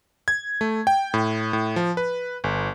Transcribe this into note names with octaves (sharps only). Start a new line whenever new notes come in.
G#6
A3
G5
A2
A2
F3
B4
G1